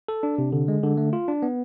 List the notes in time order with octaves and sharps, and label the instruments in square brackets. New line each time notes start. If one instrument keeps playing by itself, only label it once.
[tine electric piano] A4
D4
C3
D3
G#3
D3
A3
F4
D4
B3